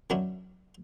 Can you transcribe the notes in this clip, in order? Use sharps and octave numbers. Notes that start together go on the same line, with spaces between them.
D#3 F#3 C#4 D4 E4